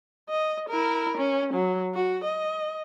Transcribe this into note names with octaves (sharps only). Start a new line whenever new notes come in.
D#5
E4 A#4
C#4
F#3
F#4
D#5